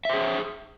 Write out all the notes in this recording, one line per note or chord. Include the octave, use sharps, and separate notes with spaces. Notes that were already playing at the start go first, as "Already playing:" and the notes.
G#4 C5 E5